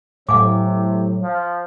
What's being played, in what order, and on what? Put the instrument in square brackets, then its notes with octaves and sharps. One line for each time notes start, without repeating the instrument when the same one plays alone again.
[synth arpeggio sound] A2 [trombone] C3 [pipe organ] F#3 [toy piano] F5 G#5 D6
[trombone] F3